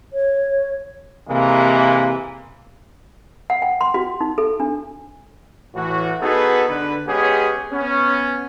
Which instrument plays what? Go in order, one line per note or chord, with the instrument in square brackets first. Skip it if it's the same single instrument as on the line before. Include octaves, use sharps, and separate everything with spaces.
[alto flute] C#5
[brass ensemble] C3 E3 G#3 A#3
[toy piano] F#5
G5
C6
F#4
D#4
A4
D4
[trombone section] A2 E3 F#4
B3 D#4 F#4 G#4 A4 B4
D3 B4
G#3 B3 C#4 G4 G#4
B3 C#4